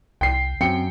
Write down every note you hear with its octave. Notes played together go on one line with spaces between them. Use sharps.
C2 G5 C7
F#2 C4 G5 C#7